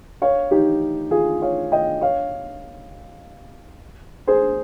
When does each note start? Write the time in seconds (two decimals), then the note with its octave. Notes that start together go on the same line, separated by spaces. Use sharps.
0.22 C#5 F5
0.51 D#4 G4
1.11 F4 G#4
1.42 C#5 F5
1.72 D#5 G5
2.01 C#5 F5
4.27 G#4 C5